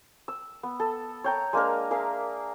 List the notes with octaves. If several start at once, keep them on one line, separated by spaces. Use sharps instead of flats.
E6
B3
A4
C#5 G5 A#5
G#3 A#3 D4 A#4
G#4 A#4 E5 F5